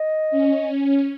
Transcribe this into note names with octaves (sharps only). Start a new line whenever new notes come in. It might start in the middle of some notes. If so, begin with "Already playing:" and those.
Already playing: D#5
C#4